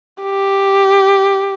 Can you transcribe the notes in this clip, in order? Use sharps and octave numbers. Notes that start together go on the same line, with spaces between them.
G4